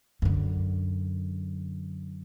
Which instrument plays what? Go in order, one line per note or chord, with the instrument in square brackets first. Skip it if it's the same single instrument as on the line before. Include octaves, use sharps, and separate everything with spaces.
[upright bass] F#2 D3